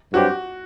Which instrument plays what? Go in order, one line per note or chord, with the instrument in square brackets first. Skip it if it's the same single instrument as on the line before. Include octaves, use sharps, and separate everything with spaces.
[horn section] G2 F#3 C4 G4 [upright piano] F#4